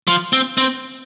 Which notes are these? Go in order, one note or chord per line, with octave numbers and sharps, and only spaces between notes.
F3
C4
C4